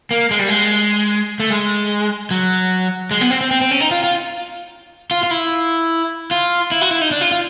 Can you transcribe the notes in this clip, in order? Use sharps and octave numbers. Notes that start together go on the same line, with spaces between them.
A#3
G#3
G3
G#3
A3
G#3
F#3
G#3
B3
C4
C4
C4
C4
C#4
D#4
F4
F4
F4
F4
E4
F4
E4
F#4
E4
D#4
D4
F4
F4